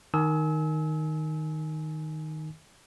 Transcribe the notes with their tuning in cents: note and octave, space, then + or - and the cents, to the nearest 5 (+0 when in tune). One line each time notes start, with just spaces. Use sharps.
D#3 +0 G#5 +25 E6 -30